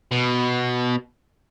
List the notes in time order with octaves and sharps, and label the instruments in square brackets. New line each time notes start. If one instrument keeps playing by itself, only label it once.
[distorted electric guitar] B2